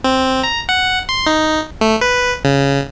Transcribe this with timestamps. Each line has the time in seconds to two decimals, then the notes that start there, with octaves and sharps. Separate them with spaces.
0.04 C4
0.44 A#5
0.69 F#5
1.09 C6
1.27 D#4
1.81 A3
2.01 B4
2.45 C#3